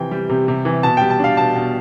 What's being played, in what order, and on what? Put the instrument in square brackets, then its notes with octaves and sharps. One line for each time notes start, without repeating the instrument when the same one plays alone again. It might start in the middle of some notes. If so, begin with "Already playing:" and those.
Already playing: [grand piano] C3 E3 F3 G5
G3
C3
C3
E3
B2 A5
G3 G5
A5
D4 F5
B2 A5
B2